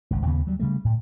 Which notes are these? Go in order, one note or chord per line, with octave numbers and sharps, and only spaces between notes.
G#1 C#2
D#2 C#3 B3
F#3 G3
C#3 G3 A3
A2